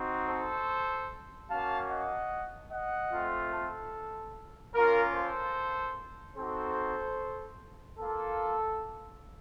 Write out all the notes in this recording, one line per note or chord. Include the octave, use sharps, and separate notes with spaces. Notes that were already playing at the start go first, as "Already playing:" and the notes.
Already playing: C4 D#4 F#4
A4 C5
A#3 C#4 F#4 F5 A5
D#5 F#5
D#5 F#5
A3 C4 F4
A4
A#3 C#4 F4 A#4
A4 C5
C4 D#4 F#4 A4 C5
A#3 F4 A4